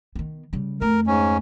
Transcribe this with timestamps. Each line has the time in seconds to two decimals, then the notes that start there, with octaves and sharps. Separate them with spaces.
0.16 D#3 B3
0.53 C#3 G3
0.81 F2 A3 A#4
1.07 G#2 C#4